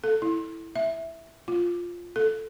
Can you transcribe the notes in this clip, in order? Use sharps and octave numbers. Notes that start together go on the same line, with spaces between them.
A4
E4
E5
F4
A4